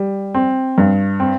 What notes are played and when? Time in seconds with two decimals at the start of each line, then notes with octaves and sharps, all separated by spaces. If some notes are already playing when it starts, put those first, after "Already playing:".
Already playing: G3
0.35 C4
0.78 G2
1.20 C4